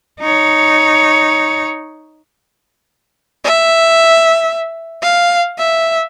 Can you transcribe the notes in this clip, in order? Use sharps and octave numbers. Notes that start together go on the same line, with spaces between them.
D#4 C#5
E5
F5
E5